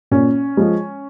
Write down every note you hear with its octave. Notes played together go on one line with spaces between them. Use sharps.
A#2 C#4
F3 G#3